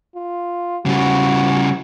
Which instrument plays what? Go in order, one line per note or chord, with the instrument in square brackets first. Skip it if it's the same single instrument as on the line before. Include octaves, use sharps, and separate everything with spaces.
[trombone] F4
[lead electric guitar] C#3 G3 [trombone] F#4